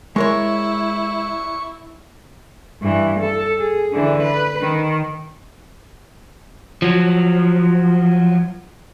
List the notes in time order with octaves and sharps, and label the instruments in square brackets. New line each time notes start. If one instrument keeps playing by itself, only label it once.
[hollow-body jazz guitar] G#3 A#4 C#5 [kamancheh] E4 [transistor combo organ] C#6
[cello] G2 E3
A4
G#4
D3 E3
B4
D#3
[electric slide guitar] F3 F#3